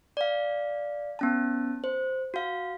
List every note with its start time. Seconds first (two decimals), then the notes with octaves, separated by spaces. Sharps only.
0.17 D5 F5
1.19 B3 C#4 A5
1.84 C5
2.34 F#4 F5